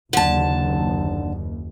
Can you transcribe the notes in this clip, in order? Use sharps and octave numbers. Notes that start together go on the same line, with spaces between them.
F#1 D#2 D3 A5